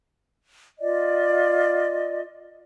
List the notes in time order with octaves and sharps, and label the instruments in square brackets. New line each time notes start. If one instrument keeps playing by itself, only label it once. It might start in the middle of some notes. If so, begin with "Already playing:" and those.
[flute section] F4 D5 D#5